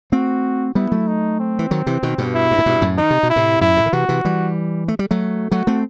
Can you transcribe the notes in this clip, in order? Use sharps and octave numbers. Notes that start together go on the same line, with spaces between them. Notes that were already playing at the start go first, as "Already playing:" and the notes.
A3 C4 F#4
G3 B3 E4
F#3 A3
D#4
C4
E3
D#3 F#3
C3 E3
B2 D#3
G2 B2
E4
G2
A2
G2 B2
F#2 A2
D#3 D#4
C3
B2
E4
A2 C3
F#2 A2 E4
A2 C3
D#3
C3 E3 F#4
C3 E3
E3 G3
A3
G3
F#3 A3
F#3 A3 F#4
A3 C4